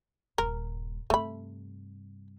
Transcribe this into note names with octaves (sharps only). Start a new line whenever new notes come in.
D#1 G2 A#4
G2 C3 A3 B5